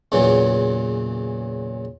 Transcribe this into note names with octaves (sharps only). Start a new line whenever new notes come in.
E2 A#2 C#3 E3 F#3